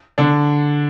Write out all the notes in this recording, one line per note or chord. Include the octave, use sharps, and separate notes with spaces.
D3 D4